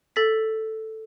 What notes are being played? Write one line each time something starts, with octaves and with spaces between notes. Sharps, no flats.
A4 A6 B6